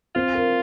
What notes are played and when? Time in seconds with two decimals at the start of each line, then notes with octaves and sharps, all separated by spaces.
0.15 C4 F4
0.35 A#4